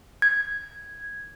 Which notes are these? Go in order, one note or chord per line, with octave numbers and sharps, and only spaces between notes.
G#6